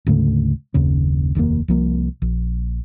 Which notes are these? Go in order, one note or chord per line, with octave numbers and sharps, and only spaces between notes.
D2 G#2 C#3 A3
F#1 D#2 C#3 C#4
F1 D#2 A2 A#3
C2 F3 A#3
A#1